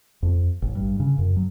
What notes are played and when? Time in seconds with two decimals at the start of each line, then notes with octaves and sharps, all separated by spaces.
0.23 F2
0.62 A1
0.75 G2
1.00 C#3
1.18 F#2
1.37 F#3